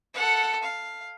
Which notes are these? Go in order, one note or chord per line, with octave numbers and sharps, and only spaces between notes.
A4 F#5
F5